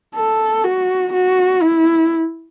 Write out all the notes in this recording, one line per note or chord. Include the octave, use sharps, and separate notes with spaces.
A4
F#4
F#4
E4